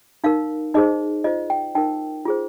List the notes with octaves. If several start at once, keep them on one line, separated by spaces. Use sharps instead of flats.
D#4 A#4 F5
D#4 G#4 C5 D#5
F4 C5 D#5
G5
D#4 A#4 G5
F4 G#4 C5